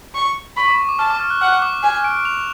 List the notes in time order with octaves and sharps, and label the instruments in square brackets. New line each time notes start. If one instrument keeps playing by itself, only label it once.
[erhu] C#6
[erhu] B5 [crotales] C#6
[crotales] D6
C#6
D6
[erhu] A5 [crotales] F6
[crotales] D6
F6
F#6
[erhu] F#5 [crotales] F6
[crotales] D6
[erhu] G#5
[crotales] D7
F7